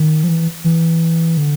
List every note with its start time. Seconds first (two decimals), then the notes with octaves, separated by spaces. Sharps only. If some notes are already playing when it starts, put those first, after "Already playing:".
Already playing: D#3
0.24 F3
0.28 E3
0.64 E3
1.37 D3